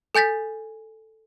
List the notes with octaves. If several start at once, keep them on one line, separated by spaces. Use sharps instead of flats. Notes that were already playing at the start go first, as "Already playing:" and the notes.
A4 G#5 G6 A6 B6